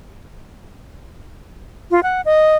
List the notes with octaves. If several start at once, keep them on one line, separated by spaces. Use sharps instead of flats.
F4
F#5
D#5